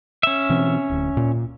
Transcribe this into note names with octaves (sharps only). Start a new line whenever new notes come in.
C#4 E5
B2 E3 C4
D1 D2
A#2